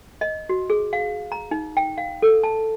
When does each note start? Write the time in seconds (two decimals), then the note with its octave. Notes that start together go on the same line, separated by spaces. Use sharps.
0.21 D#5
0.49 F#4
0.70 G#4
0.93 F5
1.32 A#5
1.51 D#4
1.77 G5
1.98 F5
2.22 A4
2.43 A5